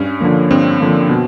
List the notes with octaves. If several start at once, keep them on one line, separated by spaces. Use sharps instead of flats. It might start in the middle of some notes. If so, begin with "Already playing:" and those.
Already playing: G2 C#4
D3 F3 A#3
G2 C4
D3 F3 A#3
B2